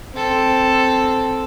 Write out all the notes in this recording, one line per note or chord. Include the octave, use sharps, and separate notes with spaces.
C4 A4